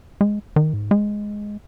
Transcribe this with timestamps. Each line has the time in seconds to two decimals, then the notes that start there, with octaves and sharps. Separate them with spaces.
0.21 G#3
0.56 D#3
0.73 G#2
0.91 G#3